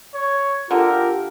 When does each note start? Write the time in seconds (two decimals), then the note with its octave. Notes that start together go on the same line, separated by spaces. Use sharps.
0.14 C#5
0.71 D3 F4 G4 A#4